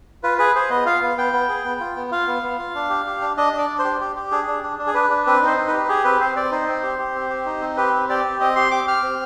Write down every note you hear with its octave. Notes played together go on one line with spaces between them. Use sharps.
F4 B4
G#4 B4
G#4 C5
B3 D#5
F4 F5
B3
B3 G5
B3
G#4
B3
F4
B3
F4 F5
B3
B3
F4
D4
G4
G4
D4
D4 D#5
D4
D5
D4
C5
G4
G4
G4
D4 G#4
D4
D4
D4
G#4
D4 B4
D4
C4 B4
D#4 C5
D#4
B4
G4
G4 G#4
C4 B4
C4 C5
C4 D5
D#4 C5
C4
G4
G4
C4
G4
D#4
C4
G4 B4
C4
G4 D5
C4
C4 D#5
G4 C6
G4 D6
G4 F6
C4